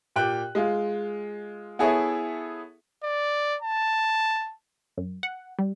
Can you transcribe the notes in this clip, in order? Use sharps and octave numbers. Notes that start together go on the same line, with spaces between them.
A#2 G4 G5 F#6
G#3 F4
B3 E4 G#4 A4 C#5 E5
D5
A5
F#2
F#5
G3